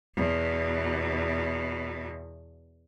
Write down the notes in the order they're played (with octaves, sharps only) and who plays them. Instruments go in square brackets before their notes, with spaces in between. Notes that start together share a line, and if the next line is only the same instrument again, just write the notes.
[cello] E2 B2